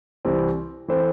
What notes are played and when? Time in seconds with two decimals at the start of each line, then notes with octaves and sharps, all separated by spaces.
0.25 C2 C3 E3 C4 G4
0.88 E3 C4 A4 C5